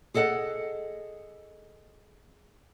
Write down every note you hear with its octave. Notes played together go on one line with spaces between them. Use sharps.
G#4 A4 D#5 F#5